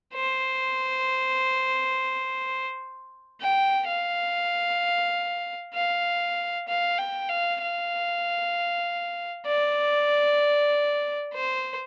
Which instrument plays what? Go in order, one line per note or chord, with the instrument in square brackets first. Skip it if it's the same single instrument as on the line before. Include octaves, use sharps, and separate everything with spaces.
[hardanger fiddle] C5
G5
F5
F5
F5
G5
F5
F5
D5
C5